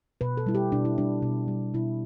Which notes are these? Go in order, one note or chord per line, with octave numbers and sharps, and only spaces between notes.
B2 B4
A4
G3 E4
G4
B2 D4
E4
G3 D4
B2
G3
B2 E4